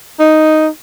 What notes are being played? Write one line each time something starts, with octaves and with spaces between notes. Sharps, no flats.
D#4